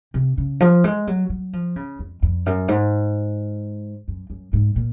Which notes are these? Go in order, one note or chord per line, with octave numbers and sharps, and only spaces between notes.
C3
C#3
F3
G#3
F#3
F#3
F3
C#3
F2
F2
F#2
G#2
F#2
F#2
G#2
A#2